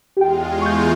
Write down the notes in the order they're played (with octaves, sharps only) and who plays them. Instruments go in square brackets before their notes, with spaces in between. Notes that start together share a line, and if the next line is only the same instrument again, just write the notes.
[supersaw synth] E2 G#3 F4 [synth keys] G4 G5
[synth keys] C#6 G6